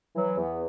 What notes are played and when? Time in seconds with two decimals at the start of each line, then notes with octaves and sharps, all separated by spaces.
0.16 E3 F#3
0.38 E2 B3